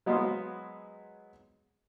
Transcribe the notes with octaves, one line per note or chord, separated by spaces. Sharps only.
F#3 G#3 B3 F#4 C5 F5